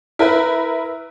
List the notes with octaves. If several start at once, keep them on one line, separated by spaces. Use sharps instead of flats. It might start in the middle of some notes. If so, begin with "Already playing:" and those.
E4 A#4 B4